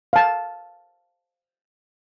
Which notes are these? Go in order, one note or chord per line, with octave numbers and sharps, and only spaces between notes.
F5 A5